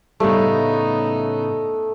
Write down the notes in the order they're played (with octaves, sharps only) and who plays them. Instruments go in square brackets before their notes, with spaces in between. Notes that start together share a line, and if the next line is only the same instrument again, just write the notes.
[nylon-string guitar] A2 C#3 G3 [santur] A3 [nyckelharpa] B3 D#4